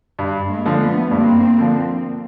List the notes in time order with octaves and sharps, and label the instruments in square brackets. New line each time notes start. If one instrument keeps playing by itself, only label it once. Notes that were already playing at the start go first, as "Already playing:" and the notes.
[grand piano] G2
[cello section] G#3 A#3
[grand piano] D3 F3
[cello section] A3 B3
[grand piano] G2 [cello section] A#3 C4
[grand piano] D3 F3